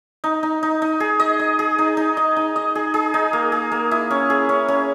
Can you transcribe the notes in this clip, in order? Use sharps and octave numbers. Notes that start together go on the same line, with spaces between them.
D#4
D#4
D#4
D#4
G#4
D#5
D#5
G#4
D#4
D#4
D#5
D#4
D#5
G#4
G#4
D#4
A#3
G#4
A#3
E4
C#4
G#4
C#4
C#4